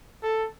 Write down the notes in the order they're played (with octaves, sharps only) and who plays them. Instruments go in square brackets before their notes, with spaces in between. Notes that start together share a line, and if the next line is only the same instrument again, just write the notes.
[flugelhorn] A4